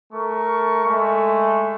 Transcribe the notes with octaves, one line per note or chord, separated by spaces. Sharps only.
A3 A#4 C#6
G#3 A3